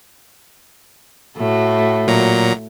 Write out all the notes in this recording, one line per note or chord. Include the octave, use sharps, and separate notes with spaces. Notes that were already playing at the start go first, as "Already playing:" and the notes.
A2 A3 F#4
A#2 F#3 A#5